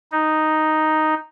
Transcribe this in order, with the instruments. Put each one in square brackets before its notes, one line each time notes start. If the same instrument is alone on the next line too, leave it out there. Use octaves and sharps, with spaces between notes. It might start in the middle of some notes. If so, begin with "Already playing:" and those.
[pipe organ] D#4